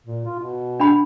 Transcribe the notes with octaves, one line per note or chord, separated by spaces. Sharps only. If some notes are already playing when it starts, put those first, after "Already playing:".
A#2
F4
B2
D4 F#5 B5